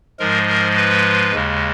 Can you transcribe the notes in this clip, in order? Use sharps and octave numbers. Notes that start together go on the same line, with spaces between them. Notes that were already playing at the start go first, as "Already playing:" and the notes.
G#2 F3 G#3 A#4
A#4
B4
D#2 C#3 G#3